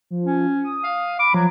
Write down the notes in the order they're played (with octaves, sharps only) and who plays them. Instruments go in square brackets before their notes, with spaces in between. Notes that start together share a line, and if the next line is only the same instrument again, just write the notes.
[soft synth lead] F3
[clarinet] C#4
[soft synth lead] D#6
[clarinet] F5
[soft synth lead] B5 [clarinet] D6
[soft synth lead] F3 [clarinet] F#3